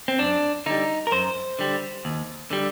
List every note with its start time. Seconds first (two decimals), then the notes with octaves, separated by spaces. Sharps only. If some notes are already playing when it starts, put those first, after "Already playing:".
0.08 C4
0.19 F#2 D4
0.66 D3 G3 D#4
1.07 A#4
1.12 F#2 C5
1.59 D3 G3
2.05 D#2
2.51 D3 G3